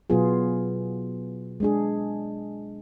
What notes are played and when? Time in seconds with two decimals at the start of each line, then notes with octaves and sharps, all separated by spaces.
0.10 B2 F#3 B3 F4 G#4
1.60 G#3 D4 G#4